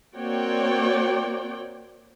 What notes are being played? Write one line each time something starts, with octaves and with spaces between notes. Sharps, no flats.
A#3 C4 F#4 C#5 D5 G5